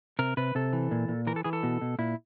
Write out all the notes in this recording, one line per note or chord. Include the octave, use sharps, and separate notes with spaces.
C3 A#4
C3 B4
C3 A4
E3
A#2
A#2
E3 A#4
A4
E3 G#4
A4
B2
B2
A#2 E4